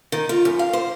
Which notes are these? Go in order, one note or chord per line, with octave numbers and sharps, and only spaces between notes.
D#3
F4
F#2
F5
C5